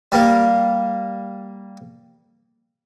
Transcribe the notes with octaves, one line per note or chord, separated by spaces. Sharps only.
G3 A#3